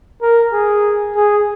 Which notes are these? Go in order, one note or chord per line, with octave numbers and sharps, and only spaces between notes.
A#4
G#4
G#4